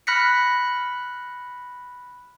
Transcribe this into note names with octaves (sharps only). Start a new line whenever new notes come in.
B5 F6 F#6 A#6 B6 C#7